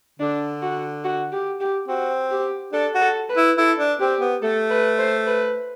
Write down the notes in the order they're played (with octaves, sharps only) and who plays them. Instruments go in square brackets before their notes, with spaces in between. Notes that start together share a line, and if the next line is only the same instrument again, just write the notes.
[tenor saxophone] D3 [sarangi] D4
[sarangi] F#4
F#4
G4
G4
[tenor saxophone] C4 [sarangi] F#4
[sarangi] G4
[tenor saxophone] D4 [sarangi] A4
[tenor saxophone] F#4
[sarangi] A4
B4
[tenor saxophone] E4
[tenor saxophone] E4 [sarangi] A4
[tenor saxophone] D4
[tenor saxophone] C4 [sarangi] G4
[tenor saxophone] B3
[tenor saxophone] A3 [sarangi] A4
[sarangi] B4
C5
B4